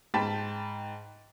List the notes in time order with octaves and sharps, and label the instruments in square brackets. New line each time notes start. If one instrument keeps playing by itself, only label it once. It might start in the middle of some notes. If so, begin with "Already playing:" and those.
[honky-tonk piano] G#2 G5 A5 B5 A6 B6